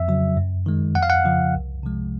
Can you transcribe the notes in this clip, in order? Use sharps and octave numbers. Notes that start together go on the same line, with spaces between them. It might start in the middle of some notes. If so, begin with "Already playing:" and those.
Already playing: F2 E5
C#3 F#3
F#2
D#3 G#3
F2 F#5
F5
F#5
C#3 F3
C2
C3 F3 G#3